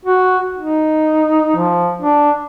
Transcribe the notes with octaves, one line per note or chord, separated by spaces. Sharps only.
F#4
D#4
F3
D4